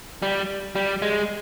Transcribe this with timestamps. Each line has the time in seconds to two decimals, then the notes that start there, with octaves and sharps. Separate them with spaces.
0.22 G3
0.75 G3
1.02 G#3